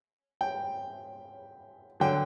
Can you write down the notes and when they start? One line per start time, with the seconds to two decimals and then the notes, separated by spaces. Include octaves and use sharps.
0.41 G5
2.00 D3 F#3 G5